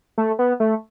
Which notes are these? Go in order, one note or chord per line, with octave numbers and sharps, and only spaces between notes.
A3
B3
A3